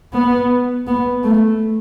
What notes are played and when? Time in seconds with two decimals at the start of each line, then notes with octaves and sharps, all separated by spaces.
0.13 B3
0.87 B3
1.24 A3